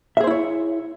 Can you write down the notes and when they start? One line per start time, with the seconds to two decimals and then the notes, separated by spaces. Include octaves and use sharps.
0.17 E5
0.20 G#4
0.24 C5
0.27 E4
0.31 C#5